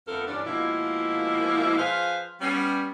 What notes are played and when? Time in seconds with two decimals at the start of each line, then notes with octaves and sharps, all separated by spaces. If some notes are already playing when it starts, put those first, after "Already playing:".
0.08 F2 D3 A3 B3 A4 A#4
0.28 G2 E3 C#4 D4
0.46 B2 F3 G#3 A#3 E4
1.78 F3 G#4 B4 C5 F5
2.41 G3 B3 C#4